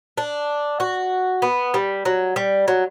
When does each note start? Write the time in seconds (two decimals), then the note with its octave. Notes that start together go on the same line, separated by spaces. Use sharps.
0.18 D4
0.80 F#4
1.42 B3
1.74 G3
2.05 F#3
2.36 G3
2.68 F#3